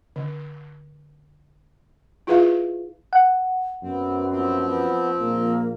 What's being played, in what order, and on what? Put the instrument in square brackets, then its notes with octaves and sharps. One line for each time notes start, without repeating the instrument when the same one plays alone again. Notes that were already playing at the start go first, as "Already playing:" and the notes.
[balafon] D3
E4 F4 G#4 B4 E5 F5
[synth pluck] F#5
[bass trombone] F#2 [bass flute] B3 [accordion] C4
[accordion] F3 C4
[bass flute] B3
[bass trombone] A#1 [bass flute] A#3